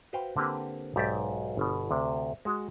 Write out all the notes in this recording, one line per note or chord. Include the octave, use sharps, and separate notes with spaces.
F#4 B4 C5 F5 G5
D3 A#3 C4 G4 B4
B1 G#2 G4 D5 E5 A#5
G1 B2
D2 C3
G#3 F#4